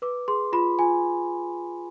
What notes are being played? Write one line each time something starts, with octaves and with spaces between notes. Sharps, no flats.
B4 D6
G#4 C6
F4 B5
F4 G#5